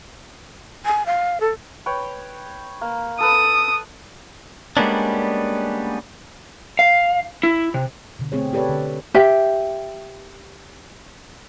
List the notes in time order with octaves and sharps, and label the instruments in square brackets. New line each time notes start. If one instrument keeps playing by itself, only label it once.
[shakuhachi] G#5
F5
A4
[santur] B4 C#5 G5
A#3
[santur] A4 B4 [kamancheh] D#6
[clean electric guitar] G3 G#3 A#3 B3 C#4 D4
[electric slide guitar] F5
E4
C3
[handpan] B2 D3
A3 C4 G#4 C#5
G4 A4 B4 C#5 D5
D3
[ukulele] G4 E5 G5